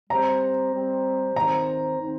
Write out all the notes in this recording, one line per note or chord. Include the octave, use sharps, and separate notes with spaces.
G3 C4 G4 C5 A#5
G3 C4 G4 C5
D#3 C4 D#4 C5 A#5
D#3 C4 D#4 C5